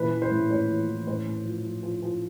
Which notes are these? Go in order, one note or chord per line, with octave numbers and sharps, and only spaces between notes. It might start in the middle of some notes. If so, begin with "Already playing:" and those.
Already playing: A#2 E3 B4
E3
C5
A2
A2 C#5
E3
E3
A2 C5
A2
F3
F3
F3
F3